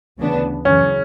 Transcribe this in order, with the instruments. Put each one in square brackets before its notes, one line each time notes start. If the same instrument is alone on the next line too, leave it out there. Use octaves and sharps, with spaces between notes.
[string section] D2 C#3 E3 B3 D4
[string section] F#2 C#3 E3 [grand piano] C#4